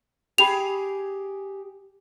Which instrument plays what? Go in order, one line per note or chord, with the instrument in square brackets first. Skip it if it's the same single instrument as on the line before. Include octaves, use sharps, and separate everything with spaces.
[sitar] G4 G#4 [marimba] G5 B5 [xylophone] F7